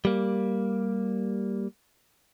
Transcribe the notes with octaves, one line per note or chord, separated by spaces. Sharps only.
G3 A#3